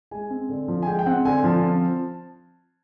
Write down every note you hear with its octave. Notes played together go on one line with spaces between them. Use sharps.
G#3 G#5
C4
D3
F3
G#5
G#3 G5
G5
C4 F#5
D3 G#5
F3 A5
C4